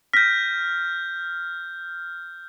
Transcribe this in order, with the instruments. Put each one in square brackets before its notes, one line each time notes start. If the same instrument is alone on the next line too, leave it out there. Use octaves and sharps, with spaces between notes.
[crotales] F6 G6 [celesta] A#6 B6